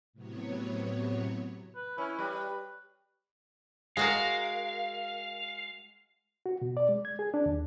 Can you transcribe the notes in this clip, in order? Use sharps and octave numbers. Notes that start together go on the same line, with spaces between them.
A2 C3 F#3 B3 C#5
B4
C#4 E4
G3 B4
G#3 F#4 A#4 F5
F#4
B2
D5
G#3
G#6
G#4
D4
D#2